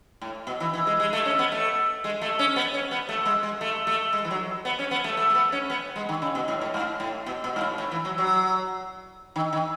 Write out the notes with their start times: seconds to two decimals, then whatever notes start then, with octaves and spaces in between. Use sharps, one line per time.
0.21 A2
0.47 B2
0.60 E3
0.74 E3
0.87 G#3
1.00 G#3
1.13 A3
1.26 C#4
1.39 B3
1.52 A3
2.04 G#3
2.22 A3
2.39 C#4
2.56 B3
2.74 C#4
2.91 B3
3.09 A3
3.25 G#3
3.43 G#3
3.61 A3
3.87 A3
4.13 G#3
4.25 E3
4.31 F#3
4.65 B3
4.79 C#4
4.91 B3
5.04 A3
5.17 A3
5.30 A3
5.35 B3
5.52 C#4
5.70 B3
5.96 G#3
6.09 D#3
6.22 C#3
6.35 B2
6.48 A2
6.61 A2
6.74 G#2
7.00 A2
7.26 B2
7.44 B2
7.56 G#2
7.61 A2
7.78 A2
7.91 E3
8.05 F#3
8.18 F#3
9.36 D#3
9.53 D#3